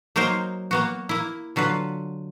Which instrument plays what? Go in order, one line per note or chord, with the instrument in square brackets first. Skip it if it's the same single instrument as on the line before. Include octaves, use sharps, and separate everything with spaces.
[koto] F#3 A#3 D#4 A#4 C5
A#3 B3 F#4
A#3 E4
D3 F#3 F4 B4